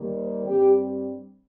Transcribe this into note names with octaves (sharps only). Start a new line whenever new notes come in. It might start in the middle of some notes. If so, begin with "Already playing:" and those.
Already playing: D#2 D#3 G3 A#3
C5
G2 G3 C4 G4